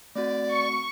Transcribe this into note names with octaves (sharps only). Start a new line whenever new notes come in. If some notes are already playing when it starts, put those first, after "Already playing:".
A3 C4 F#4 D5
C#6